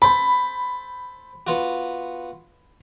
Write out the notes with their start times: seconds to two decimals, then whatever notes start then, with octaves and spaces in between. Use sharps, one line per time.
0.02 A4 C5 B5
1.47 B3 F4 F#4